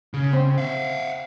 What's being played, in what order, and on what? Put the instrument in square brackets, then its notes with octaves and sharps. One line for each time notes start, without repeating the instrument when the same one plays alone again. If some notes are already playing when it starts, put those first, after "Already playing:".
[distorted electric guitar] C#3
[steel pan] C4
[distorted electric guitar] E5 F5